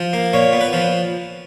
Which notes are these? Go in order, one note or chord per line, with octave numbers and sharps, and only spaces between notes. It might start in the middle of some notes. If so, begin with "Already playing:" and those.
Already playing: F3
A#3
A#2 C#5
B3
B4
F3